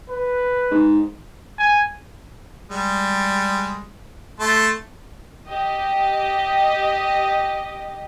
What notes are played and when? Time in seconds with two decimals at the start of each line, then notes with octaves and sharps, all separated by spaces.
0.10 B4
0.71 G#2
1.58 G#5
2.70 G3 G#3
4.40 A3 A5 C6
5.47 G4 D#5